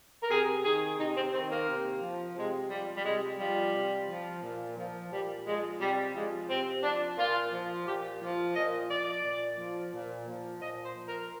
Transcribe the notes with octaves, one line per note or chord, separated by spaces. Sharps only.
A#4
C3 G#4
D#3 G#4
C3 D#4
C4
D#3 C4
A#3
C3
F3
C3 G#3
F3 G3
G3
C3 G#3
F3 G3
C3
F3
A#2
F3
A#2 G3
F3 G#3
C3 G3
F3 G#3
C3 C4
F3 D4
A#2 F4
F3
A#2 G4
F3
A#2 D#5
F3 D5
A#2
F3
A#2
F3
A#2 D#5
C5
F3
A#4